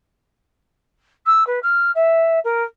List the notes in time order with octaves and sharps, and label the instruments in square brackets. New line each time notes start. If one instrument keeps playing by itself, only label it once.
[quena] E6
B4
F6
E5
A#4